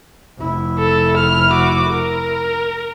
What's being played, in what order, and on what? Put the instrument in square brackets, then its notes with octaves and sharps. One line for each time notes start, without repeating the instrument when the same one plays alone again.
[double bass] F1 E4
[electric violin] A4
F6
F#4 D6
A#4